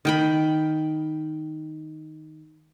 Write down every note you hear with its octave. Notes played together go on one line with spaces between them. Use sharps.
D#3 G5 B5